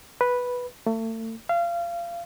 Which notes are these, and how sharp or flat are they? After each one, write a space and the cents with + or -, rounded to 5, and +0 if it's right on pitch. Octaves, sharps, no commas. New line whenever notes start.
B4 -5
A3 +35
F5 -25